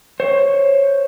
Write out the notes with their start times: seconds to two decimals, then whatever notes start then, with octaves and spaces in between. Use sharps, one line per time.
0.20 C5 C#5